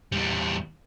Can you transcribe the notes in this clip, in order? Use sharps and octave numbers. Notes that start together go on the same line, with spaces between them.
E2 G3